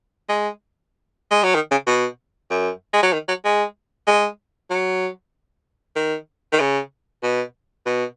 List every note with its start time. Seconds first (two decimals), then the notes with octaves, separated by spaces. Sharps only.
0.29 G#3
1.31 G#3
1.43 F#3
1.55 D#3
1.71 C#3
1.87 B2
2.50 F#2
2.94 G#3
3.03 F#3
3.13 D#3
3.28 F#3
3.45 G#3
4.07 G#3
4.70 F#3
5.96 D#3
6.52 D#3
6.60 C#3
7.23 B2
7.86 B2